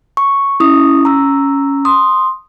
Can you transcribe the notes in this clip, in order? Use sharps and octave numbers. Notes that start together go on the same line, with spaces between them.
C#6
C#4 E4 D#6
A#5 E6
C6 D#6